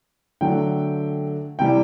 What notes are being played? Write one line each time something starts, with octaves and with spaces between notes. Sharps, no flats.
D3 F#3 A3 G5
C3 E3 G3 G5